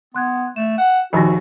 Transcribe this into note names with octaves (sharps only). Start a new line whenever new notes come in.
B3 C6 F#6 G#6
A3 E7
F#5
A#1 D#2 F#4 G#5 B5 A#6